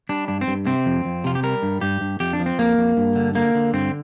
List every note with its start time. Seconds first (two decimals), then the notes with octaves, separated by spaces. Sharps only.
0.09 G3 D4
0.28 G2 D4
0.41 C4
0.47 G2
0.67 C3 C4
0.86 F2
1.05 F2
1.24 C3 F4
1.35 G4
1.43 G3 A#4
1.63 G2
1.81 G2 G4
2.01 G2
2.20 F2 G4
2.33 D4
2.40 F3
2.46 C4
2.59 F2 A#3
2.78 F2
2.97 G2
3.16 D3
3.35 D3 A#3
3.55 D3
3.73 G2 C4